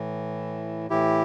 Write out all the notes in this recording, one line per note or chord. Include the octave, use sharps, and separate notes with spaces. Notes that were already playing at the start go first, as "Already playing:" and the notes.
Already playing: A2 E3
A2 E3 E4 G4